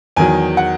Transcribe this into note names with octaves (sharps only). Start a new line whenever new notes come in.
E2 D#3 F#3 G#5
F#5